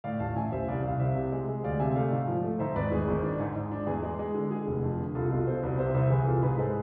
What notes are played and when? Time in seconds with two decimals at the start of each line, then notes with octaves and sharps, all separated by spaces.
0.04 A2 D5 F5
0.20 A1 F5 A5
0.36 A1 E5 G#5
0.52 A1 C5 E5
0.68 C2 D5 F5
0.84 C2 F5
0.99 C2 C5 E5
1.15 C3
1.32 G#3
1.47 G#3
1.63 D2 D5 F5
1.79 C3 E5 G#5
1.96 A3 D5 F5
2.11 G#2
2.28 F3
2.44 A3
2.59 G#2 C5 E5
2.75 G#1 B4 D5
2.91 G#1 G#4
3.08 G#1
3.23 D4
3.40 G#2
3.56 G#2
3.71 D4
3.87 E2 G#4
4.03 G#3 G#4
4.19 G#3
4.34 D3
4.51 D3 G#4
4.67 F1
4.83 F2
4.99 D3
5.15 C2 F4 A4
5.31 B2 F4 A4
5.47 B2 A4 C5
5.63 C2 B4 D5
5.78 C3 C5 E5
5.94 C2 C5 E5
6.10 E3 G#4 B4
6.26 C2 F4 A4
6.43 G#2 G#4 B4
6.58 G#3 A4 C5